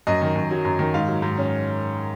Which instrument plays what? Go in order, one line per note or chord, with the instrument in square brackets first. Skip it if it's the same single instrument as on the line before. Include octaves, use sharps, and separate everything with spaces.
[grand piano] F#2 D#5
D#3
F#2
F#3
F#2
D#3
G#2 F5
F#3
G#2
C#4